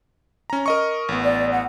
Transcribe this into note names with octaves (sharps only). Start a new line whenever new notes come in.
C#4 A#5
A#4 D#5 C#6
A1 B3
D5
F#5